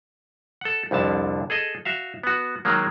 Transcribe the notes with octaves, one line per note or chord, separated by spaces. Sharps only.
A4 F#5
C2 F2 D3 A5
G#4 A4 D#5
F#4 E5 F5
B3 F#4
D#3 F#3 G#3 A#3